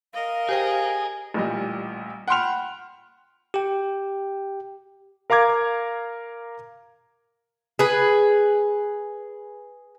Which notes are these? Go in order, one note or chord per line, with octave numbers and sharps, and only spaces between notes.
A#4 D#5 F5
G4 G#4 C5 G5
A1 A#2 G3 D#5
F#5 G5 B5 C6 F6 F7
G4 G5
A#4 F5 A#5 D6 G#6
G#4 B4